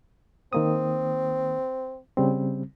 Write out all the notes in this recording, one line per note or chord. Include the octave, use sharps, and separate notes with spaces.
D#3 A#3 C4 D#6
C#3 G3 C4